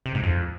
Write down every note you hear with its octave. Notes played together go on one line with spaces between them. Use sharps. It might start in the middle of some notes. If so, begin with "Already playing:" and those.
C3
G#2
F2